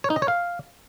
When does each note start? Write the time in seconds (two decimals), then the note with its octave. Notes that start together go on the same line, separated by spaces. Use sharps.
0.04 C#5
0.10 D#4
0.16 D#5
0.22 C#5
0.28 F5